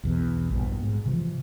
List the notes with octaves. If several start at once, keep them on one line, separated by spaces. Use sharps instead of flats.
B1 E2 B2
A#1 G2 B2
G#2
C3 E3 F3